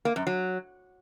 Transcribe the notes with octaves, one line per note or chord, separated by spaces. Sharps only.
A#3
F#2
F#3